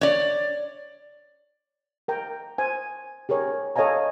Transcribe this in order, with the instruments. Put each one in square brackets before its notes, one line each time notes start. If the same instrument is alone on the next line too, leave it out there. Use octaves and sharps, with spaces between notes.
[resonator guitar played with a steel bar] C#5 D5
[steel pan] A#4 G5 A#5
C5 G#5
G4 G#4 A#4 C#5
A4 C#5 D#5 F5 G#5 A#5